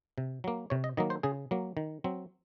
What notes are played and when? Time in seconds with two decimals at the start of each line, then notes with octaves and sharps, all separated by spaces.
0.18 C3
0.44 F#3 A#3
0.70 C3 C#5
0.84 D#5
0.97 D#3 F#3 A#3 D#5
1.10 C5
1.23 C#3 G#4
1.51 F#3 A#3
1.77 D#3
2.04 F#3 C4